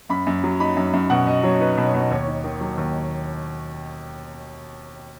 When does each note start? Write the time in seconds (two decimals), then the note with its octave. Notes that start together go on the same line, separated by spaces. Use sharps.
0.09 F#2 B5
0.27 F#2
0.43 F#3
0.60 D#4 B5
0.76 F#2
0.93 F#2
1.10 B2 F#5
1.27 B2 D#5
1.43 F#3 C#5
1.61 D#4 B4
1.77 B2
1.85 C#5
1.94 B2
2.11 D#2 C#5
2.27 D#4
2.44 D#3
2.61 F#3
2.77 D#2